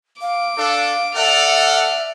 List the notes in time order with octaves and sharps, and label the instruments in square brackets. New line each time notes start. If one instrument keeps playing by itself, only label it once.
[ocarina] F5 [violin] D6
[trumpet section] D4 A4 [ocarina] F5
[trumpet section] A4 F#5 [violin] D5 F6 [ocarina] E5